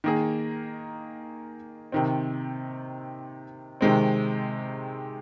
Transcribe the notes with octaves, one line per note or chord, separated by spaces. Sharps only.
D#3 A#3 G#4
C3 D#3 C4
C3 D#3 G#3 C4